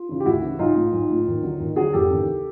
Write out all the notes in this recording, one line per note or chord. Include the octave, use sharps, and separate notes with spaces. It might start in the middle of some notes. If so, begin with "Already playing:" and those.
Already playing: F4
C#3 E3
G4
D2 E4 F#4
C#3 E3
B1 D#4 F4
A2 F3
B1
A2 F3
D#2
D3 F#3
D#2
D3 F#3 F#4 G#4
F1 G4 A4
D#2 C#3 E3